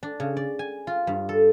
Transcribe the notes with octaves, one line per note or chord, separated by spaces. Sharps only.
D4
C#3
D5
G#5
F4
G2
A4